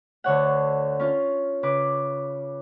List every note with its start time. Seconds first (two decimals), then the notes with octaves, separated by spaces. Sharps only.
0.24 D2 D3 C#5 F#5
1.00 C#4 F4
1.63 C#3 B4 D6